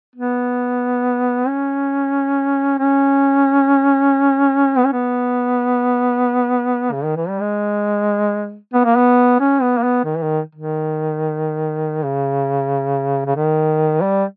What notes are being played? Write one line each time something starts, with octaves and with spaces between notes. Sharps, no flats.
B3
C#4
C#4
B3
C#4
B3
C#3
D#3
E3
G3
G#3
B3
A#3
B3
C#4
B3
A#3
B3
D#3
E3
D#3
D#3
C#3
C#3
D#3
G3